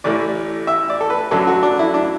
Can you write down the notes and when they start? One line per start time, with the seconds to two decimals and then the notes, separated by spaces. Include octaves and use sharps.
0.04 A1 A2 A3 D5
0.67 E5
0.90 D5
1.01 A4
1.10 B4
1.31 F#2 F#3 A3 D4 A4
1.47 F#4
1.63 D4
1.79 E4
1.94 D4